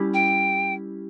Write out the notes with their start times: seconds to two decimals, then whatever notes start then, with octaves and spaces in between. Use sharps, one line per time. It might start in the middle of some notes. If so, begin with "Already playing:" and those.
Already playing: G3 C#4 E4 G4
0.14 G5